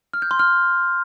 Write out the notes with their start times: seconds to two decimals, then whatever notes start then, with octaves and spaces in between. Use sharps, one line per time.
0.13 F6
0.22 G6
0.31 C6
0.39 F6